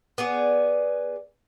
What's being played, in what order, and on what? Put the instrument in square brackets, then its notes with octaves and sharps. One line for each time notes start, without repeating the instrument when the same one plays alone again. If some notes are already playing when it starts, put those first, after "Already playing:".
[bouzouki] B3 G#4 D5